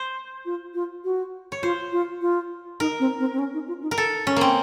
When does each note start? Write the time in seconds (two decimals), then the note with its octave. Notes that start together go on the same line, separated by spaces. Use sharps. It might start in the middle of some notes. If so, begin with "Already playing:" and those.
Already playing: C5
0.46 F4
0.74 F4
1.04 F#4
1.52 C#5
1.63 F4 C5
1.92 F4
2.21 F4
2.80 D#4 A#4
3.00 C4
3.19 C4
3.33 C4
3.39 C#4
3.54 D#4
3.68 F4
3.82 D#4
3.91 A#4
3.98 A4
4.27 C#4
4.36 A#3 C4